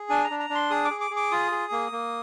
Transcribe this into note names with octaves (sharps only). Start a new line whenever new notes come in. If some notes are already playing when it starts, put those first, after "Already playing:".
Already playing: G#4
D4 G#5
A#5
D4
A#5
D4
C6
G#4 D#6
D6
G#4
D6
G#4
D6
F4 D#6
G#4
A#3
A#3